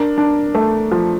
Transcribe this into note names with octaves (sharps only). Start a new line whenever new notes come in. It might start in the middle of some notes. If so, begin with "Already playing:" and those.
Already playing: D4 A#4
D4
A3
F3